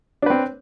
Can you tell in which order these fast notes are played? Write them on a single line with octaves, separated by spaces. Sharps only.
D4 B4 C4